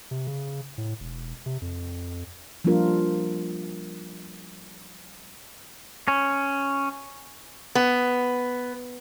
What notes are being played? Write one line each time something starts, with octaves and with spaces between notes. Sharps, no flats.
C3
C#3
A2
E1
C3
F2
F3 G3 A#3 D4 F4 A#4
C#4
B3